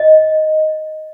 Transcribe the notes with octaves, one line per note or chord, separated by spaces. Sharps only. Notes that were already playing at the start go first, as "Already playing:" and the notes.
Already playing: D#5